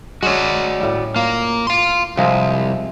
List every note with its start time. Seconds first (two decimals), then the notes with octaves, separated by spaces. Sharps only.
0.23 G#3 C#4 F#4 D5
0.80 A2 G3
1.16 A#3 F4
1.67 F5 C6
2.17 C2 C3 F3 G#3